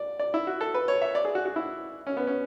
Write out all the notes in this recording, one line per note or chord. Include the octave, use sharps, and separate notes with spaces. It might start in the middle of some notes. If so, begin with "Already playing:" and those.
Already playing: D5
D5
E4
F#4
A4
B4
C#5
E5
D5
G#4
F#4
F#4
E4
C#4
B3
C#4